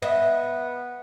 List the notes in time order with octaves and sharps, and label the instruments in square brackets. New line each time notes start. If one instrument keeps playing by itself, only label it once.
[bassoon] B3 [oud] D#5 E5